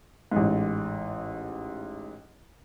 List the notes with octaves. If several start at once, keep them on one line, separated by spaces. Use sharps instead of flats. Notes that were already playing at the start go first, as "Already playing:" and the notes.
A1 G#2